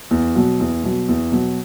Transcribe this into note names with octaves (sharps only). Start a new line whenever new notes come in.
E2
B2 F#3
E2
B2 F#3
E2
B2 F#3